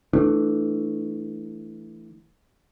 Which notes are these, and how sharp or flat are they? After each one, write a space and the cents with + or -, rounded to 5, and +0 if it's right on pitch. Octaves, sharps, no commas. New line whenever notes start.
E3 +0 A3 +0 D4 +25